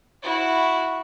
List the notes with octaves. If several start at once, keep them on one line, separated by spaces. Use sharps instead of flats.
E4 F#4